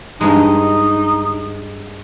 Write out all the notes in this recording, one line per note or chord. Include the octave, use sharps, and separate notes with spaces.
G2 G#3 D#4